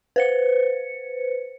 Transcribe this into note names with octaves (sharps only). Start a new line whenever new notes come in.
B4 C5 C#7